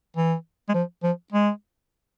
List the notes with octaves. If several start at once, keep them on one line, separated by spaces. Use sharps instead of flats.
E3
G#3
F3
F3
G#3